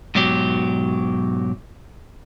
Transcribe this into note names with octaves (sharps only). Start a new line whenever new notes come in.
G#2 B2 F#3 G4